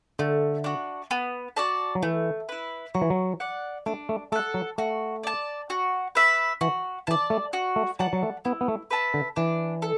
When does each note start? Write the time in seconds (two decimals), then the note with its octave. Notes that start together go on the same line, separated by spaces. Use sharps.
0.19 D3 A3
0.64 D4 F#4
1.11 B3
1.56 F#4 D5 A5
1.95 F#3
2.03 E3 A3
2.49 E4 B4
2.94 F#3 F#4
3.01 E3
3.10 F#3
3.40 D5 F#5
3.86 A3 D4
4.09 A3
4.32 A3 A4 F#5
4.54 F#3
4.78 A3 F#4
5.23 D5 A5
5.70 F#4
6.15 B4 E5
6.61 E3 F#4
7.07 E3 A5
7.11 D5
7.30 A3
7.53 F#4
7.76 A3
7.99 F#3 D5 F#5 A5
8.13 F#3
8.23 A3
8.45 B3 E4
8.61 B3
8.68 A3
8.91 B4 E5 A5
9.14 D3
9.36 E3 D4
9.82 A4